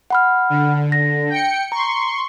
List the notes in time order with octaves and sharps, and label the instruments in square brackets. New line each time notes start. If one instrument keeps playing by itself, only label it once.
[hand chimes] F#5 B5 F6
[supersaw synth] D3
[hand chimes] A#6
[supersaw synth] G5 C#7
[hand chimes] A#5 [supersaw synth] C6 C#6